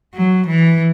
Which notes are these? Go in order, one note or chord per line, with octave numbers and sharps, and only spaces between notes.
F#3
E3